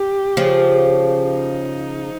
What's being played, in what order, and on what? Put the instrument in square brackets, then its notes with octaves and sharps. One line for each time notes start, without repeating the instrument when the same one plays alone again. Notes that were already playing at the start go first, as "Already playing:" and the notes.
Already playing: [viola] G4
[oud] C#3 F3
[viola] D#4